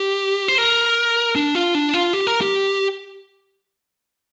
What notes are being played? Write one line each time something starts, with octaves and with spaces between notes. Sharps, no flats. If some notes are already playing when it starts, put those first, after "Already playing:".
Already playing: G4
C5
A#4
D4
F4
D4
F4
G4
A#4
G4